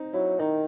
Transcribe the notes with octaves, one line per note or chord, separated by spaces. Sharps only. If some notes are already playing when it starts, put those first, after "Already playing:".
Already playing: C4 D#4
F#3 E4
D#3 D#4